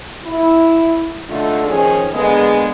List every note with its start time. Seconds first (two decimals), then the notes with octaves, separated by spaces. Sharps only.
0.24 E4
1.29 D3 A3 D#4 F4
1.66 D#3 F3 C#4 G#4
2.13 D3 G#3 A#3 B3 G#4